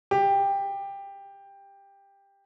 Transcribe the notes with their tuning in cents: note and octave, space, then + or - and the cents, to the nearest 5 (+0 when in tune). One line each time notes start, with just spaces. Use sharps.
G4 +15